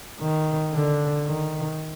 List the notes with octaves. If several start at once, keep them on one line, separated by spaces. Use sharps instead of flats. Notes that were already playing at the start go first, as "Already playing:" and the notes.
D#3
D3
D#3